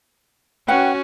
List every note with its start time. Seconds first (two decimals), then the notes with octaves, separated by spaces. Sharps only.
0.68 C#4 F#4 B4 F#5 G5